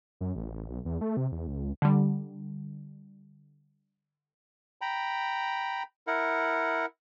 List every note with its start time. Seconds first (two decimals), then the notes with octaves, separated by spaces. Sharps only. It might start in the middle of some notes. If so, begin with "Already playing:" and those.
0.21 F#2
0.36 A1
0.69 B1
0.85 E2
1.01 A3
1.17 C3
1.32 E2
1.47 C#2
1.82 D3 G3
4.81 G5 A#5 B5
6.07 E4 A#4 F#5